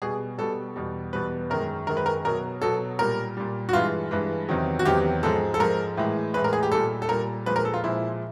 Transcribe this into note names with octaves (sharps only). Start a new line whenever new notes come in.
B2 G3 G#4
B2 G3 A4
E2 B2 G3
E2 B2 G3 B4
F#2 D#3 G#3 A#4
F#2 D#3 G#3 A#4
B4
A#4
B2 F#3 A#4
B2 F#3 A4
A#2 G3 A#4
A#2 G3
F#4
G2 E3 G#3 F4
G2 E3 G#3
E2 C3 D#3 F#3
F#4
E2 C3 D#3 F#3 G4
G#2 F3 G#3 A4
A4
G#2 F3 G#3 A#4
A2 E3 G#3
A2 E3 G#3 B4
A#4
G#4
G4
A#2 G3 A4
A4
A#2 G3 A#4
A#2 F3 G#3 B4
A#4
A4
F4
A#2 F3 G#3 E4